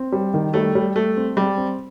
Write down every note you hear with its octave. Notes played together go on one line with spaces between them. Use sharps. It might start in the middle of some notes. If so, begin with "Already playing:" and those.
Already playing: C4
G3
D#3
G3 A3
G3
G3 A3
C4
G3 C4
C4